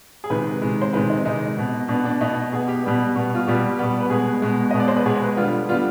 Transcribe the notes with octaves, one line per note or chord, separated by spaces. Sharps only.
G#4
C3 D#3 G#3 B4
C3 D#3 G#3
C5
C3 D#3 G#3 B4
D#4
C3 D#3 G#3 D#4
B2 B3
B2 B3 D4
D4
B2 B3 D#4
B2 B3 G#4
G4
B2 G3 B3
B2 G3 B3
F4
B2 G3 B3 G4
B2 G3 B3
B4
B2 G#3 B3 G#4
B2 G#3 B3
B2 G#3 B3 D#5
D5
C5
B4
B2 G#3 B3 G#4
B4
D3 G3 B3 F4
D3 G3 B3 F4